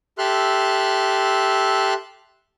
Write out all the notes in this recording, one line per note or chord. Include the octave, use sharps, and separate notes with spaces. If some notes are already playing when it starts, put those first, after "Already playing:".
G4 A4 E5 C6 F6 F#6